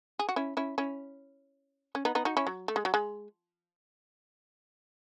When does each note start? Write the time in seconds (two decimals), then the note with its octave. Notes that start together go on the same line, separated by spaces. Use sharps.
0.19 G#4
0.29 F#4
0.36 C#4 E4
0.57 C#4 E4
0.78 C#4 E4
1.95 C#4
2.05 B3 D#4
2.15 B3 D#4
2.25 D#4 F#4
2.37 C#4 E4
2.47 F#3
2.68 A3
2.76 G#3
2.85 F#3
2.94 G#3